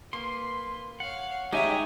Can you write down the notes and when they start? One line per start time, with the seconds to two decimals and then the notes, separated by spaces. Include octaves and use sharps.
0.13 A#3 B4 C6
1.00 C#5 F5 F#5
1.52 G#3 D#4 G4 C#5 D#5 E5 G5 G#5